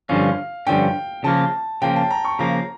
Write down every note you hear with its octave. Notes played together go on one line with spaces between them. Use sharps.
G2 D3 F3 C#4 F5
G2 D3 F3 C#4 G5
C#3 F3 A#3 A5
C#3 F3 A#3 G5
A5
A#5
C#6
C#3 F3 A#3 A#5